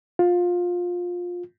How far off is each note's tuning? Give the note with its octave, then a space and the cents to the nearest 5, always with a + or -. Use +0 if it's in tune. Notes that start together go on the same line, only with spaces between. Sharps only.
F4 +20